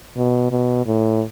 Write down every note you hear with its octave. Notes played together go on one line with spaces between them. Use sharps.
B2
B2
A2